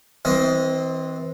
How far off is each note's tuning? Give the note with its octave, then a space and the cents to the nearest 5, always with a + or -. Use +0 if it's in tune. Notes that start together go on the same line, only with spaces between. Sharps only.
E3 -30 C4 +0 D#5 +10